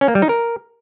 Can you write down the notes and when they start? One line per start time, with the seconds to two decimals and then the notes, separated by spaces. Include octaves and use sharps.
0.01 C#4
0.08 A#3
0.15 G3
0.22 D#4
0.29 A#4